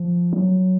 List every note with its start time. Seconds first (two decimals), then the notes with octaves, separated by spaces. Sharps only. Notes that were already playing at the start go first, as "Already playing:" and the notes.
Already playing: F3
0.33 F#3